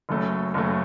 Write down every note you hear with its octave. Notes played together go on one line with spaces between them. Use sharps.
F#1 F#2 F#3 A3
F#1 F#2 F#3 A3